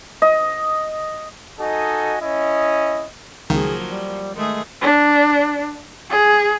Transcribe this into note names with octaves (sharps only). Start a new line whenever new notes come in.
D#5
D#4 F#4 A4 D#5 G#5
C#4 E4 D#5
C#2 D#3 F3 F#3 A#3 G#4
G3
D#3 G#3 A3 G#4
D4
G#4